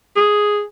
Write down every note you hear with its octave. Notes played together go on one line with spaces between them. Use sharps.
G#4